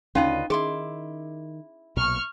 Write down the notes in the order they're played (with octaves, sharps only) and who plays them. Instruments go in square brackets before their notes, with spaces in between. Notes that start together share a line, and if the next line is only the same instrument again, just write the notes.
[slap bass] D2 C#3 [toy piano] C#4 D#4 [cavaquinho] F4 B4 D#5
[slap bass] D#3 [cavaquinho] E4 C6 D6 [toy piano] G#4
[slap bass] B1 A#2 [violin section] C#6 F6